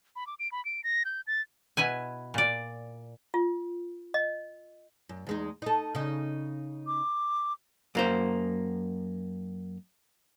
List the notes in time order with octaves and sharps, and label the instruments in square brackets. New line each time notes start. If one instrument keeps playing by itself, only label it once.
[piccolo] B5
D6
D7
B5
D7
A#6
G6
A6
[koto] B2 E4 B4 G#5
A#2 D5
[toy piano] F4
D#5
[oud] F#2
E2 G#3 D#4
D#4 A4
C#3 D#4
[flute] D6
[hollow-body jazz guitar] F#2 A#3 C5